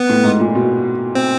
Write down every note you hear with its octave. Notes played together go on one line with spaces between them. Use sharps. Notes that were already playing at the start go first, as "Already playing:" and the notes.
Already playing: B3
A2
G#2
A#2
B2
C4